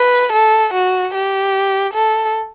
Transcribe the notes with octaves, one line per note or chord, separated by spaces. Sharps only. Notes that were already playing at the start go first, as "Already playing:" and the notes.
Already playing: B4
A4
F#4
G4
A4